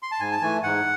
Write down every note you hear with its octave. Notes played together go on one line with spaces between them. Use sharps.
C6
A5
G#2 G#5
A5
E3 A3 G#5
G#2 F#5